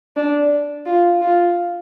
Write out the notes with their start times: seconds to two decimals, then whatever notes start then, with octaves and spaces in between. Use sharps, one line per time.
0.16 D4
0.86 F4
1.21 F4